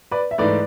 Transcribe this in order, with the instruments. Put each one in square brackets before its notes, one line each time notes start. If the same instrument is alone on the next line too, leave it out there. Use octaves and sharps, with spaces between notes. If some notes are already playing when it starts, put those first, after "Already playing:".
[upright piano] B4 D5
E5
[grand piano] G#2 E3 A3 [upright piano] B4 D5